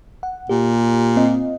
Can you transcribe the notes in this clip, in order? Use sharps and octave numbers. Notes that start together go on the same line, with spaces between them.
F#5
A#2 G4
C4 F4 D#5